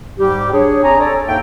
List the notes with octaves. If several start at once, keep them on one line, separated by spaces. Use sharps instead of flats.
G#2 G3 G4
D4 G#4 C#5
C4 D4 C#5 G#5 A#5
A4 C#5 D5
D#2 G#2 A4 E5 G5